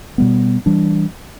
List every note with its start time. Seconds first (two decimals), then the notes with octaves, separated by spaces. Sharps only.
0.18 B2 G3 B3
0.66 E3 G3 D4